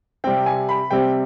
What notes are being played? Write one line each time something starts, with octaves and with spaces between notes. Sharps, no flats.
C3 G3 C4 G5
G#5
B5
C3 G3 C4 G5